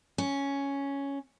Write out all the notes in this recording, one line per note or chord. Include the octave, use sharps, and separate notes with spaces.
C#4